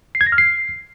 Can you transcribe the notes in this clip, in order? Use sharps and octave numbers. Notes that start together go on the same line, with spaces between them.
C7
G#6
A#6
F6
C7